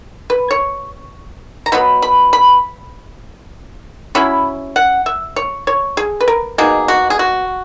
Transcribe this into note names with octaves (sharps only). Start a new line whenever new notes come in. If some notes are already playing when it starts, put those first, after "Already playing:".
B4
C#5
A#5
B2 F#3 B3 B5
B5
B5
F#3 C#4 E4 B5
F#5
E5
C#5
C#5
G#4
B4
A#4
B2 A#3 D#4 G#4
F#4
G#4
F#4